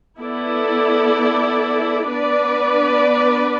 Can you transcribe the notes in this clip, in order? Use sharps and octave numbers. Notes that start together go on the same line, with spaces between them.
B3 E4 A4 D5
B3 D4 B4 D5